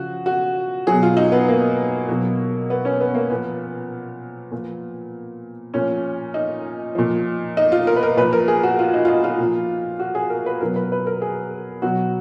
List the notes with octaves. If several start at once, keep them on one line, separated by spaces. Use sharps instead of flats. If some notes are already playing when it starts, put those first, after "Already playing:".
Already playing: C#3 F3 F#4
F#4
B2 F#3 G#4
F4
D#4
B3
A#3
B2 F#3
B3
C#4
B3
A#3
A#2 F3 B3
A#2 F3
A#2 F3 C#4
D#4
A#2 F3
D#4
F4
A#4
B4
A#4
A#2 F3 B4
A#4
G#4
F#4
F4
D#4
F4
D#4
F4
A#2 F3
F#4
G#4
A#4
B4
B2 F#3 A#4
B4
B4
A#4
G#4
B2 F#3 F#4